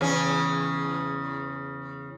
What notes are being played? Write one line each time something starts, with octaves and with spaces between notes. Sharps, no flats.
E2 C#3 C#4